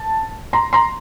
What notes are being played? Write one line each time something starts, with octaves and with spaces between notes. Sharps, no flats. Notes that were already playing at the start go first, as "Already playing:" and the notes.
Already playing: A5
A#5 C6
A#5 C6